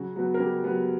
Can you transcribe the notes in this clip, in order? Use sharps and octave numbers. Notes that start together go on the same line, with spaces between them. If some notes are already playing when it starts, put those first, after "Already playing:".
Already playing: C#3 F#3 F#4
F#3 B3
A#4
C#3 G3 G4
F#3 B3